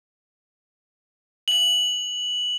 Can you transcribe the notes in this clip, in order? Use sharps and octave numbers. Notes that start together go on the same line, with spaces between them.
F#7